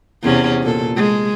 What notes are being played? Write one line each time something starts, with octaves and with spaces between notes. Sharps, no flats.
E2 C3 C#4
A#2 A4
G#3